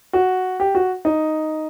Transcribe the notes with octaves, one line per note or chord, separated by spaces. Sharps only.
F#4
G4
F#4
D#4